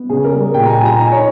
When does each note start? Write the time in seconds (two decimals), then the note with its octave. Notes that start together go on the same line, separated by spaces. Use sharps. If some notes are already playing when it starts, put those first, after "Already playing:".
Already playing: B3
0.09 C#3 G#4
0.24 A#4
0.32 G3
0.54 A#2 G5
0.66 A#5
0.70 G#5
0.77 A#2
0.85 A#5
1.00 D#4 G#5
1.11 C#5